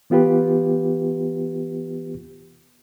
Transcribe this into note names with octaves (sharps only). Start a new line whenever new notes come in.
E3 B3 F4 G4 B4